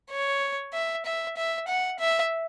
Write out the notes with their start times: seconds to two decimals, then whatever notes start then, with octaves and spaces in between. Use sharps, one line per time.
0.11 C#5
0.74 E5
1.06 E5
1.37 E5
1.68 F#5
2.00 E5